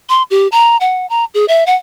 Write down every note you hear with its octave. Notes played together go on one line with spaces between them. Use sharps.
C6
G4
A#5
F#5
A#5
G#4
E5
F#5